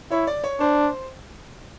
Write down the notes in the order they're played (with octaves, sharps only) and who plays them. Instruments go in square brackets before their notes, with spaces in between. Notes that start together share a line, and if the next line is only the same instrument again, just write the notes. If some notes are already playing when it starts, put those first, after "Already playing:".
[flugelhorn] E4 [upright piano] C#5
[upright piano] D5
C#5
[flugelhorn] D4 [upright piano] C5